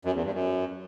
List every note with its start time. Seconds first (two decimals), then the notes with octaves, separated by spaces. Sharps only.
0.05 F#2
0.15 E2
0.24 G2
0.34 F#2